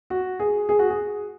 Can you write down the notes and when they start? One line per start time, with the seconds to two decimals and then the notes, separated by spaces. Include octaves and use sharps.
0.10 F#4
0.39 G#4
0.69 G#4
0.79 F#4
0.90 G#4